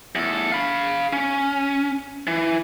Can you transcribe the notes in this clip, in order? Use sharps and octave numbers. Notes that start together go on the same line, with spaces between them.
E2 A4
F5 B5
C#4
E3